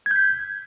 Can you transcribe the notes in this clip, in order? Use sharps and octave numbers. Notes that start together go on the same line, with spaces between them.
G6 G#6 B6